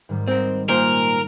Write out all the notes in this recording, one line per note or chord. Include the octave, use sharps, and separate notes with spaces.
G#2 D#3 G3
C4 A#4
A#2 A#3 A#4 C5